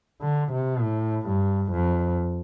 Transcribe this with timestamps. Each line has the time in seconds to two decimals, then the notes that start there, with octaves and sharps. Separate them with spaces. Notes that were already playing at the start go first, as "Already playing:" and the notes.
0.22 D3
0.52 C3
0.81 A2
1.27 G2
1.72 F2